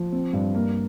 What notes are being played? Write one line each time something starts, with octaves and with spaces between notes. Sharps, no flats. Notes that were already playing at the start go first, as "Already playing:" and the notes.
Already playing: F3
C4
G2
A#3